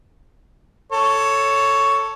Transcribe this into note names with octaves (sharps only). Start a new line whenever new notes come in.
A4 C#5